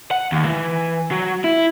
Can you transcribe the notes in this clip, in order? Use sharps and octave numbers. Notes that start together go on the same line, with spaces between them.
F#5
D#2
E3
F#3
E4